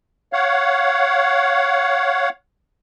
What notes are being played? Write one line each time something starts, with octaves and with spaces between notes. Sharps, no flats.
C#5 F5 F#5